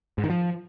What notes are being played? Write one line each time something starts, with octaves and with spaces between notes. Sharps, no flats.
G#2
D#3
F3